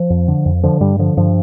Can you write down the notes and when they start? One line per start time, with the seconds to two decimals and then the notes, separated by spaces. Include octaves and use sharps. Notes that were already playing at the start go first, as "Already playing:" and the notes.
Already playing: F3
0.10 F2
0.28 D3
0.45 F2
0.63 D3 F3
0.80 G2 G3
0.99 D3 F3
1.17 G2 F3